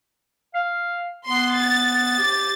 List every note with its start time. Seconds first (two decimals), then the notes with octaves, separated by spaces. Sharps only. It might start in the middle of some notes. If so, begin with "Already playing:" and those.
0.54 F5
1.28 B3 C6
1.57 A6
2.18 G4